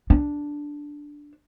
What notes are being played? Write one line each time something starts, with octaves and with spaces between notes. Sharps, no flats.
D4